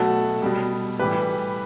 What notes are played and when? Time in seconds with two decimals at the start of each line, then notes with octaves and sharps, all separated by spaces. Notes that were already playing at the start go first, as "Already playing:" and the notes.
Already playing: B2 F#3 A3 F#5 A5
0.42 B2 G3
0.99 A2 E3 G3 G4 B4